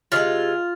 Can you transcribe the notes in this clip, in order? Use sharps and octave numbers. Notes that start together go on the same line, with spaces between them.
C3 D#3 G#3 F4